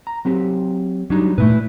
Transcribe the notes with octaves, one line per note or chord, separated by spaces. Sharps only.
A#5
F#3 C4 G4
F#3 G3 D4 D#4
A#2 A3 E4 B4